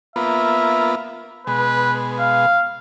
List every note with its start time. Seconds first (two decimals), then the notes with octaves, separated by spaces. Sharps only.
0.16 A#3 B3 F4 E5
1.47 B2 G#3 B4
2.19 F5